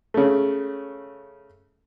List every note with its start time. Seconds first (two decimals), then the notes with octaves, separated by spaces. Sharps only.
0.14 C#3 A3